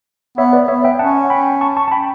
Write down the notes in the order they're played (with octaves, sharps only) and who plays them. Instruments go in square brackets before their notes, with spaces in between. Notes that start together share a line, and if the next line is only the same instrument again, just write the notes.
[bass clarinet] B3 [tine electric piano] C#5 E5
[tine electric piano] B4 D5
[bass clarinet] B3 [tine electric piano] C#5 E5
[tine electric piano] E5 G5
[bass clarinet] C#4 [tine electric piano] F#5 A5
[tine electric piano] G5 B5
A5 C#6
A5 C#6
A5
G5 B5